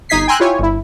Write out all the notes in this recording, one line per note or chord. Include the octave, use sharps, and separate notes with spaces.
G1 D#4 D#5 G#6 B6 C7
G5 G#5 A#5 C6 E6 F#6
E4 F4 G4 C#5 G#5
G1 E4